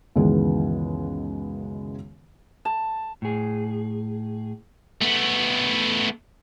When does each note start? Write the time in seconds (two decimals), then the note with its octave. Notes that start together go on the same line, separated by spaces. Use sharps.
0.15 C#2 F#2 D#3 E3 G#3 B3
2.65 A5
3.22 A2 G#4
5.02 A3 B3